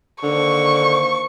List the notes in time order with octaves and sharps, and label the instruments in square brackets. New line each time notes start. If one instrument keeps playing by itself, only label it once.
[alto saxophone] D3 [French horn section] D#3 A#3 C5 [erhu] C#6